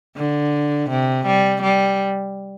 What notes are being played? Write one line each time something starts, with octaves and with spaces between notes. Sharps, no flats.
D3
C3
G3
G3